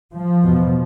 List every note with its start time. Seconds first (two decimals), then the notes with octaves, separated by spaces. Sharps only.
0.14 F3
0.43 E2 B2